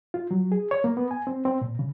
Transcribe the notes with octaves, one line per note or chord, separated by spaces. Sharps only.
F4
F#3
G#4
C#5
A#3
B3
G#5
C4
C4
A#2
C#3